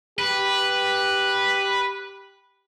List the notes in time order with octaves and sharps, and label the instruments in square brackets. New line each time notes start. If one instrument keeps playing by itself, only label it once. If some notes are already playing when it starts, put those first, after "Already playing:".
[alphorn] G4 [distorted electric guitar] B4